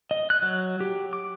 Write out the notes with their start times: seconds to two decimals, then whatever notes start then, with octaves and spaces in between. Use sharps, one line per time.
0.11 D#5
0.30 F#6
0.42 F#3
0.80 G4
1.13 D6